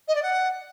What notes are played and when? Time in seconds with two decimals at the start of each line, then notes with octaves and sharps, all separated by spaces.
0.07 D#5
0.15 D5
0.22 F#5